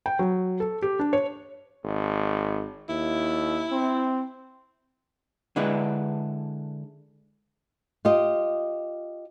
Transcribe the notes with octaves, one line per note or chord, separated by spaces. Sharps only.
G5
F#3
A4
G4
D4
C#5
G#1
D#2 E4
C4
D3 G#3 D4 E4 B4
F4 G4 D#5